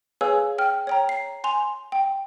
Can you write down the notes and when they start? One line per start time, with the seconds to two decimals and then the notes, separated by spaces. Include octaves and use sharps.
0.21 G#4 B4 C#5 F5 G#5 E6
0.58 G5 F6
0.87 C#5 G5 A#5
1.09 C7
1.44 G#5 C6 F7
1.92 G5